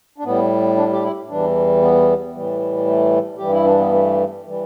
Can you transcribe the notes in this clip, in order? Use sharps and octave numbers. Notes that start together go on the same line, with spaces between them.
D4
A2 G3 B3
D4
G4
E4
E2 E3 G3 D4
B3
A2 E3 G3
A3
G2 E3 G3 G4
E4
D4
B3
A3
E3 G3